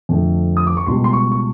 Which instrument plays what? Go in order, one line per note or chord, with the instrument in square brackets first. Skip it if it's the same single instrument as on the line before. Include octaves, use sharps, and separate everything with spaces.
[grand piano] F2 D3 F3 A3
D#6
D6
C#6
C#2 B2 G3 C6
C6
C#6
C#6